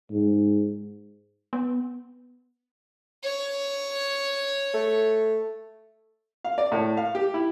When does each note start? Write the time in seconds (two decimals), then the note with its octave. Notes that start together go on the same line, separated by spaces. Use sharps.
0.11 G#2
1.53 B3
3.24 C#5
4.74 A3
6.45 F5
6.58 D5
6.72 A2
6.97 F5
7.15 G4
7.34 E4